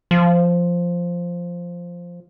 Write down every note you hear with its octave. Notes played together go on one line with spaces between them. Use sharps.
F3